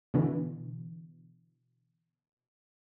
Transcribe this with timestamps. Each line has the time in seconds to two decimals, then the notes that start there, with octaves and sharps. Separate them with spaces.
0.14 B2 D3 E3